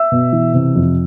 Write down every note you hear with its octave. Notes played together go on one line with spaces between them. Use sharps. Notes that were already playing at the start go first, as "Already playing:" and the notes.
Already playing: E5 E6
B2
E3
C3
F2